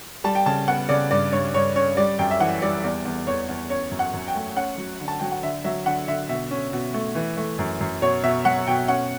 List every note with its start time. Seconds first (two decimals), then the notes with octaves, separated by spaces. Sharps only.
0.24 G3 A5
0.35 G5
0.46 C#3 A5
0.67 B3 F#5
0.89 C#3 D5
1.11 G2 D5
1.32 G2 C#5
1.54 G2 C#5
1.75 C#4 C#5
1.97 G3 D5
2.19 F#2 G5
2.31 E5
2.40 E3 F#5
2.62 G3 D5
2.84 E2 D5
3.05 E2
3.27 E2 C#5
3.48 E2
3.70 C#4 C#5
3.91 F#2
3.99 F#5
4.14 F#2
4.28 G5
4.35 A3
4.56 C#4 F#5
4.78 F#3
5.00 D3
5.08 A5
5.19 F#3 G5
5.31 F#5
5.43 D3 E5
5.64 F#3 E5
5.86 D3 F#5
6.08 D3 E5
6.29 B2 E5
6.51 C#4
6.73 B2
6.94 A3
7.15 E3
7.37 A3
7.59 F#2
7.81 F#2
8.02 B2 C#5
8.23 B2 E5
8.45 F#3 F#5
8.67 B2 G5
8.88 C#4 F#5